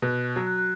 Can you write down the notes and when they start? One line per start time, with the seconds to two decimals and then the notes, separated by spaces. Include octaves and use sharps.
0.02 B2 F#6
0.36 F#3
0.47 F#6
0.58 F#6